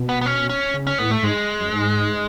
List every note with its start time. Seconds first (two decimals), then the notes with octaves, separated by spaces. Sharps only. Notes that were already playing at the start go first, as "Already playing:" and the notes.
Already playing: B2
0.09 B3
0.21 B3
0.26 C#4
0.49 C#4
0.74 C#3
0.87 C#4
0.98 A2 B3
1.11 A3
1.23 G#2 G#3
1.60 F#2
1.72 G#2